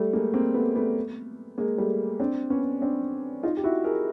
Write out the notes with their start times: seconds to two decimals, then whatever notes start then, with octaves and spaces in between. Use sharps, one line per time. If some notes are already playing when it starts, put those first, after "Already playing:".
Already playing: G3 A3
0.13 G#3 A#3
0.34 A#3 C4
0.54 A3 B3
0.76 A3 B3
1.58 G#3 A#3
1.78 G3 A3
2.20 C4 D4
2.50 B3 C#4
2.82 C4 D4
3.43 D#4 F4
3.57 G4
3.64 E4 F#4
3.84 G#4 A#4